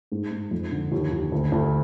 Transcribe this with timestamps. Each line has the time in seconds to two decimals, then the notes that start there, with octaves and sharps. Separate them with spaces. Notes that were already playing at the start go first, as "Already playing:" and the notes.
0.12 G#2
0.31 G#2
0.51 F2
0.71 D3
0.92 D#2
1.12 D#2
1.32 D2
1.52 D2